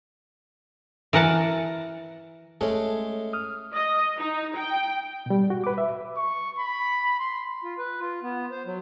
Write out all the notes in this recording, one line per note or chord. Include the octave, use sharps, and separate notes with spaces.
E3 A#4 F#5 A5
G#3 A3 C#4 A4 C#5
D#6 F6
D#5
D#4
G5
B2 G3
F#4
B4 D6
E5
C#6
B5
C6
F4
B4
F4
B3
C5
F#3